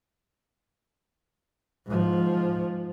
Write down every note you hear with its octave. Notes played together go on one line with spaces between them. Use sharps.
G#2 F3